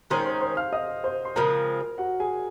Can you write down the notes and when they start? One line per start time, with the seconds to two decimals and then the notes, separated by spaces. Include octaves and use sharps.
0.10 D#3 G#3 C#4 G#4 C5 C6
0.25 C5 C6
0.41 C5 C6
0.57 F5 F6
0.73 D#5 D#6
1.04 C5 C6
1.25 C6
1.36 C#3 F3 G#3 C4 A#4 A#5
1.98 F#4 F#5
2.20 G#4 G#5